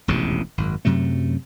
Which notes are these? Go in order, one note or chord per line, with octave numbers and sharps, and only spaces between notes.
E1 A1 F2 C3
G#1 F#2
F#2 C3 F#3 A3